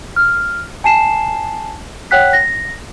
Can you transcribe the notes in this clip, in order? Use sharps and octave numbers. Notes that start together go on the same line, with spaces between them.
F6
G#5 A5 C7 E7
C#5 F#5 G5 F#6 B6
A#6